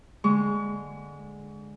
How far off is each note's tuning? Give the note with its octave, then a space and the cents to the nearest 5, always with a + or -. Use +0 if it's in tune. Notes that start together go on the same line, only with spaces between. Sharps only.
D3 +0 G#3 +0 C#6 +40